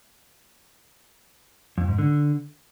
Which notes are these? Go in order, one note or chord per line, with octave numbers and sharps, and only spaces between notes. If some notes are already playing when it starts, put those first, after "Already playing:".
F2
G#2
D3